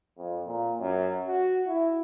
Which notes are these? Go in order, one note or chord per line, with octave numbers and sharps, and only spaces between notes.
F2
A#2
F#2
F#4
E4